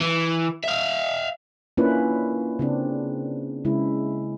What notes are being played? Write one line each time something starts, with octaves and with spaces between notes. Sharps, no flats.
E3
E5 F5
A#3 C#4 D4 E4 F4 B4
C#3 C4 D4
C#3 G#3 E4